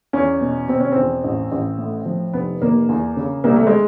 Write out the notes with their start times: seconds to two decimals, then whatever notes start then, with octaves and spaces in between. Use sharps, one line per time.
0.13 E2 C#4
0.41 B2
0.68 B2 C4
0.80 C#4
0.92 E2 C4
1.23 A1
1.51 A1
1.78 A2
2.06 F3
2.33 F1 B3
2.61 F1 A#3
2.89 E2
3.16 C#3
3.44 C2 A#3
3.56 A3
3.67 G#3